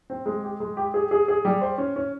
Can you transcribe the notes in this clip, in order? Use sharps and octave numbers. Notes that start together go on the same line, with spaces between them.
C4
G#3
G4
G#3
G4
G#4
G#4
G#4
G3
C5
C#4
C#4